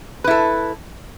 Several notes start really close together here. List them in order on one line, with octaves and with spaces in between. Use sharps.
B4 E4 A4